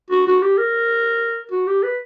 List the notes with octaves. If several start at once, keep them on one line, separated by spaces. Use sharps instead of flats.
F#4
F#4
G4
A#4
F#4
G4
B4